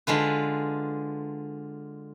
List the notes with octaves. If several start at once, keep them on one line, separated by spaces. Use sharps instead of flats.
D3 G#3 F4 B4